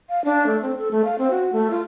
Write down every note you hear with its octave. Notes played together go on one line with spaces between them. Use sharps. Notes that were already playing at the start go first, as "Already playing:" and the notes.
F5
D4
A3
C4
A4
A3
F5
C4
F#4
A3
F4